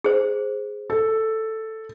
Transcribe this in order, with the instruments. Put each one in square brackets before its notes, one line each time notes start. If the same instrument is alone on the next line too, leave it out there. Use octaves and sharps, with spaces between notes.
[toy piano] G#4 C5
[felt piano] A4